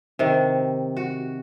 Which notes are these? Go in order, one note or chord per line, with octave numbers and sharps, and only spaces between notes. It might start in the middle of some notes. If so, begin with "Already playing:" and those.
C3 D#3
F#4